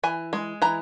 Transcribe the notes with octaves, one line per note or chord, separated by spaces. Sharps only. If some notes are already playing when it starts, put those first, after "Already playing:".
E3 G#5
G#3
E3 A#5